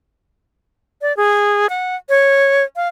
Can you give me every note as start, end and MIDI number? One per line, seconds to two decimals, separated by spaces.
1.02 1.15 74
1.17 1.67 68
1.70 1.96 78
2.09 2.64 73
2.76 2.88 77